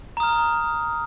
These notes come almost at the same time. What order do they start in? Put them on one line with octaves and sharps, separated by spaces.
A#5 D#6 F6